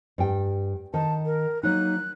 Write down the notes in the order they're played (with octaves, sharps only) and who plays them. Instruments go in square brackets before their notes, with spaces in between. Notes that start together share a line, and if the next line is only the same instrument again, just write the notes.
[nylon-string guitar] G2 G5
[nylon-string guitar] D#3 [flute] A5
[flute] A#4
[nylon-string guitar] F#3 A#3 D#4 [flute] F#6